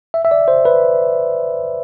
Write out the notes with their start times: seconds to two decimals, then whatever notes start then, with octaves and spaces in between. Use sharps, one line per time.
0.14 E5
0.25 E5
0.31 D5
0.48 C5
0.65 B4